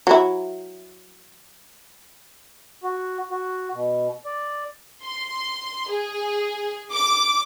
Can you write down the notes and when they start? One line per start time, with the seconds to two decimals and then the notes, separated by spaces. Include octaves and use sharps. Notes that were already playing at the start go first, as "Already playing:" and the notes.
0.07 F#3 E4
2.84 F#4
3.31 F#4
3.73 B2
4.25 D5
5.05 C6
5.91 G#4
6.93 D6